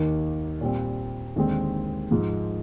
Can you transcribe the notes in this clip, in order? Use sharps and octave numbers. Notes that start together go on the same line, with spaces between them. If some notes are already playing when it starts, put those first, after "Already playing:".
Already playing: D#2 D#3 A#3 D#4
A#2 G3 C4
D#2 D3 G#3 C4
G#2 F3 G#3